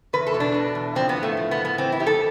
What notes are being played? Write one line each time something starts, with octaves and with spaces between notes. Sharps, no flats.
E2 B4
A4
B2
D4
B2
E2
F3 C4
B3
A2
A3
F3
B3
A2
B3
E3 C4
E4
F2 G4
A4